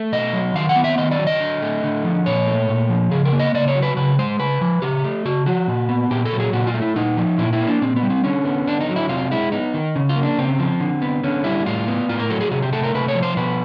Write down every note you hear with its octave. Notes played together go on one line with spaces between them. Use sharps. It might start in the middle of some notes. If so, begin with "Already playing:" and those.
Already playing: A3
B2 D#5
F#3
D#3 F5
F#5
B3
E5
D#3 D#5
D5
F#3
D#5
D3
A3
D3
F3
A#2 C#5
A3
A#2
F3
C#3 G#4
A#4
A#3
D#5
C#3 D5
C#5
F#3
B4
C#3 B4
G#3 C5
C#3 B4
F3
C#3 G4
A3
C#3 F#4
F3 F#4
A#2
B3
A#2 G4
A4
F#3
G#4
A#2 F#4
F4
A3
E4
A#2 D#4
F3
A#2 E4
E4
A#3
D4
A#2 C4
B3
G3
C4
D3 C#4
B3
D3 D4
D#4
F#3
E4
C3 F4
G#3 E4
B3 D#4
D#3
C#3
F4
A#3
D4
C#3 C4
F3
D3
B3
D3 C#4
G3 E4
A2 F4
B3
A2 F4
A#4
F#3 A4
G#4
C3 G#4
G4
A3 A4
A#4
C3 B4
C#5
F3
C5
B2 B4